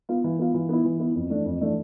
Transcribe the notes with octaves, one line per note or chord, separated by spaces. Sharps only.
B3 F4
E3
B3 F4
E3
B3 E4
E3
B3 E4
F2
E3 A3 D4
F2
E3 A3 D4